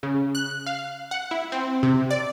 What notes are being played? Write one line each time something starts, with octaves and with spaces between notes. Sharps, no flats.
C#3
F#6
F5
F#5
E4
C4
C3
D5